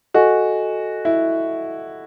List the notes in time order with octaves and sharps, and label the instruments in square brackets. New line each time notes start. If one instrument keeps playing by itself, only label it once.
[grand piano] F#4 [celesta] A4 D#5 G#5
[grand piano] E4